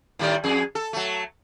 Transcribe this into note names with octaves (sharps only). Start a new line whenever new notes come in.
A2 D#3 G3
F2 G#4
A4
F#3 A3